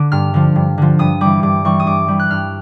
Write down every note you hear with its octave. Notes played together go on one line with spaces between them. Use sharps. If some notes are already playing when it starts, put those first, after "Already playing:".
Already playing: D3 D6
G2 F6
D3 F3
G2
D3 F3
G2 D#6
E3 G3 D6
G2 D6
E3 G3 C#6
D#6
G2 D6
E3 G3
F#6
G2 F6